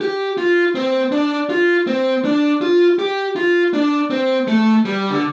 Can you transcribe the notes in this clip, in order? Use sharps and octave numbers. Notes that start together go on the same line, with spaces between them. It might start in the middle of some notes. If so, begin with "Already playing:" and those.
G4
F4
C4
D4
F4
C4
D4
F4
G4
F4
D4
C4
A3
G3
D3